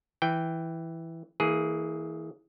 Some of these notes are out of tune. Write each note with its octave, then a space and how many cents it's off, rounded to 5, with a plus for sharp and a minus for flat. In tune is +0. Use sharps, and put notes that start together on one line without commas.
E3 +0 G5 +0
E3 -25 A#3 -25 G#4 +5